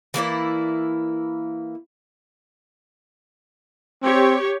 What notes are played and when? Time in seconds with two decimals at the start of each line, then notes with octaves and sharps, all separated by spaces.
0.14 E3 A#3 E4 D5
4.02 C4 G4 C#5